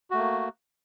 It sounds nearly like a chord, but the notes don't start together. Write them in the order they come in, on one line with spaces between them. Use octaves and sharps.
F#4 A3 A#3